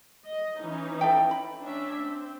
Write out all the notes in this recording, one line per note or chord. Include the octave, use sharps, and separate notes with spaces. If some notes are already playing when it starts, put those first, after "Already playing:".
D#5
E3 C#4 D#4
A4 E5 G5
B5
C#4 D4 E5
C4